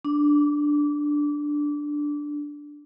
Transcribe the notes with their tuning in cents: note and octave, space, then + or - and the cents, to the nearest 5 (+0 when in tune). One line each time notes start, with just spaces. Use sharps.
D4 +0 D6 -25